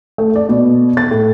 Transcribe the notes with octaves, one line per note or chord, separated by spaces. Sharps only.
A3
D5
B2
A6
A2